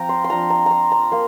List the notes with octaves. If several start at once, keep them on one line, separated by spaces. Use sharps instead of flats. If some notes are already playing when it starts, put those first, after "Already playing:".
Already playing: F3 C4 F4 G5 A#5
C6
C6
F3 D4 F4 A#5
A#5
A#5 C6
A#5
A#3 C6